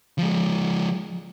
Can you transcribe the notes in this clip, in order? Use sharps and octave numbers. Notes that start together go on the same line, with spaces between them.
F3 G#3